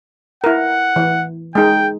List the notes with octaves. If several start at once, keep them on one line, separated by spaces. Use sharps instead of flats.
E4 A#4 F#5
E3
G#3 D#4 G5